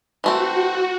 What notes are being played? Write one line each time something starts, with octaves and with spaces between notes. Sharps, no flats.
E3 A3 C4 F#4